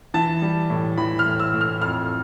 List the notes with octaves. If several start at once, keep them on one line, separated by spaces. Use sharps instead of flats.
E3 A5
G3
A2
E3 B5
F6
A2
E6
A2
F6
F2 F6